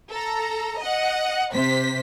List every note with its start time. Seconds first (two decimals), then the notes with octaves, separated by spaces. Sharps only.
0.10 A4 A#5
0.79 D#5 F#5
1.53 C3 C5 B6